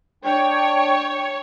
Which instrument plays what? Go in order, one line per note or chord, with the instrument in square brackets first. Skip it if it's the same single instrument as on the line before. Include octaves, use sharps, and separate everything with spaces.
[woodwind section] D4 D5 G5 [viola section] C#5